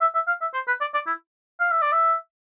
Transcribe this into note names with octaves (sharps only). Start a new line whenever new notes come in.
E5
E5
F5
E5
C5
B4
D5
D5
E4
F5
E5
D5
E5